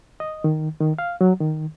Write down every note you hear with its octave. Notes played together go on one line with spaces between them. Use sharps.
D#5
D#3
D#3
F5
F#3
D#3